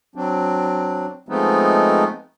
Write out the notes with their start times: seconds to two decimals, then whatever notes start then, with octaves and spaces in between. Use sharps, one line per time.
0.15 F#3 C4 D4
1.29 F3 G#3 A3 B3 C4 D#4